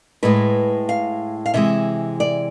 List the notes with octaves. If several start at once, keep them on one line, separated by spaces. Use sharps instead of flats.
A2 G#3 B4
F5
F5
C3 E3 G#3 E5
D5